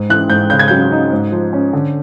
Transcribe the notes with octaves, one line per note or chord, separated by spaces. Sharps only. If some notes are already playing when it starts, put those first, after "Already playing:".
Already playing: G#2
E3 F#6
G#2 G6
C#3 G6
G#6
F#3 G6
D#4
G#2
F3
C#4
D3